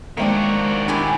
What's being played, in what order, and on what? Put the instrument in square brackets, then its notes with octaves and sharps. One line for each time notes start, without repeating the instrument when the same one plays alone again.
[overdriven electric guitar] D#3 F#4 [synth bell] G#3 E5 C#7 [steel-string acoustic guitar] A#3 C4 D4
[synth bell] D4 [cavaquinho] E4 G4 G#5